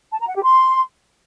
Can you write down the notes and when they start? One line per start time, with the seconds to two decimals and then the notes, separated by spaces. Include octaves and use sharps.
0.12 A5
0.20 A#5
0.28 F#5
0.36 G4
0.43 C6